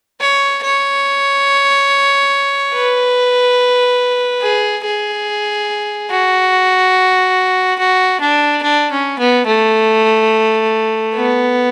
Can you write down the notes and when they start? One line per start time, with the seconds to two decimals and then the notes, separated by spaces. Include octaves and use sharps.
0.21 C#5
0.64 C#5
2.74 B4
4.42 G#4
4.84 G#4
6.11 F#4
7.79 F#4
8.21 D4
8.63 D4
8.91 C#4
9.19 B3
9.47 A3
11.16 B3